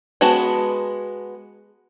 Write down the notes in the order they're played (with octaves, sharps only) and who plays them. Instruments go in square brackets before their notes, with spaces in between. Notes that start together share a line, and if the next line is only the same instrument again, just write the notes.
[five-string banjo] G#3 B3 F#4 A5